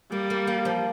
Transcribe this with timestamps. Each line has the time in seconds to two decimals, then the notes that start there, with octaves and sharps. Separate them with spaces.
0.11 G3 A#3
0.30 A#3
0.47 A#3
0.65 F3